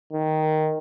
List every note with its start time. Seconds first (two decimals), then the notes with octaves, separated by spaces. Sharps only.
0.12 D#3